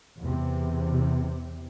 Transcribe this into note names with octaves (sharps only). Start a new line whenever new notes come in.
E2 C3